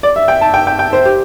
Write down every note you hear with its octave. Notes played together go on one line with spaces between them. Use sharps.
D5
E5
G5
A5
G5
G5
G5
C5
G4